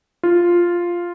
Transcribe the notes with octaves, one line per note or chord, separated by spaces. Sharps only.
F4